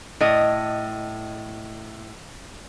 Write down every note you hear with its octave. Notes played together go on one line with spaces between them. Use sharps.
A2 D#5